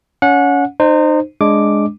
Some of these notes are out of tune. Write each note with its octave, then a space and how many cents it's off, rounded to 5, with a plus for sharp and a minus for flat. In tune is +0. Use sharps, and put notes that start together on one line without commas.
C#4 +25 F#5 -25
D#4 -30 C5 +0
G#3 +0 D4 -5 D6 +0